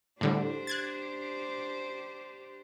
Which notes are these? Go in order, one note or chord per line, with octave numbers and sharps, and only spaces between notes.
A2 D3 G3 D4 G4 C5
F#6 G#6 A6